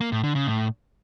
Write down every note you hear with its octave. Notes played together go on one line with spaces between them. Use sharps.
A#3
A2
D3
C#3
A2